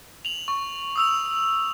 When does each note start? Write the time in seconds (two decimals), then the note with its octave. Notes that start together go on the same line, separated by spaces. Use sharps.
0.25 F7 F#7
0.48 C#6
0.96 D#6 E6 F7